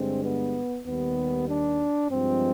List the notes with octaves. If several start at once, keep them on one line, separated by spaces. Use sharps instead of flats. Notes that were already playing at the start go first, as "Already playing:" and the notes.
Already playing: G2 D3 G#3 C4
B3
D#2 D#3 G3 B3
D4
G2 F3 G#3 C4